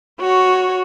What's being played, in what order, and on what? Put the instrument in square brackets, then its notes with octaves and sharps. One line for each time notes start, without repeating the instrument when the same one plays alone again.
[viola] F#4 C#5